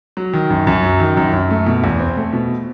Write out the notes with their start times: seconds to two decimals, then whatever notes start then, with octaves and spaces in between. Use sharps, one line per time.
0.17 F#3
0.33 D#3
0.50 F#2
0.67 F#2
0.83 F#3
1.00 D#3
1.17 F#2
1.33 F#2
1.51 A3
1.66 B2
1.84 E2
1.99 C4
2.17 A3
2.33 B2